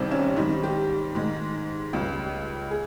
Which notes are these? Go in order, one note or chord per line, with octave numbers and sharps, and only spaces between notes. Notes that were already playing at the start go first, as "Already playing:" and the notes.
Already playing: C2 C3 D#3 G3 C4
C#4
G#2 D#3 G3 D#4
G4
G#2 D#3 G#3
C#2 C#3 G3
G#4